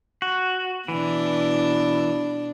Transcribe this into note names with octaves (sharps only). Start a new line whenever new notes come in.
F#4
B2 E3 D4